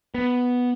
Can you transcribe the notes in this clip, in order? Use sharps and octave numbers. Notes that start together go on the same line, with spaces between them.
B3